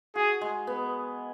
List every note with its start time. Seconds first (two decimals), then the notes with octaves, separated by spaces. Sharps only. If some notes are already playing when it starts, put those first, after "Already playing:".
0.15 F#4 G#4
0.41 G#3
0.67 B3